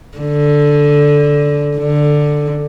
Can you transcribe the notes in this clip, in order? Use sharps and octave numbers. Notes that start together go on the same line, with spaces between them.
D3
D3